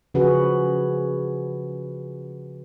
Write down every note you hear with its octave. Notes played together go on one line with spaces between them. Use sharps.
C#3 F3 F#4 G#4 B4